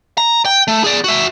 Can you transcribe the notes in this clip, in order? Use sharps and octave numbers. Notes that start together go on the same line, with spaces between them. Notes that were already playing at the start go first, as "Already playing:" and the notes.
A#5
G5
A3
G#4 D5
F#4 E5